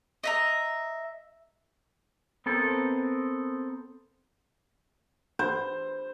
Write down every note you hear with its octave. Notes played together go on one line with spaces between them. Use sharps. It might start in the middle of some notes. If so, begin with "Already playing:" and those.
D#5 E5 A#5
B3 C4 A4 A#4
C5